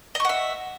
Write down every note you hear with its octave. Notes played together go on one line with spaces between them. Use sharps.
D#5 E5 F#5 C#6